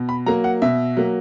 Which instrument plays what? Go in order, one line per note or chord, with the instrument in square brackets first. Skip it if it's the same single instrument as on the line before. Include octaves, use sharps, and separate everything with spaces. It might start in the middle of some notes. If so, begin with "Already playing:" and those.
Already playing: [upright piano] B2
B5
F#3 A#3 A#5
F#5
B2 E5
F#3 A#3